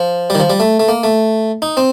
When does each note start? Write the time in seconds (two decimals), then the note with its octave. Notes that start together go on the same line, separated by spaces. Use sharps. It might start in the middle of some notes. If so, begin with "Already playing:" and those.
Already playing: F3
0.30 D#3 G3
0.40 F3
0.50 G3
0.60 A3
0.80 A3
0.88 A#3
1.04 A3
1.62 D#4
1.77 C4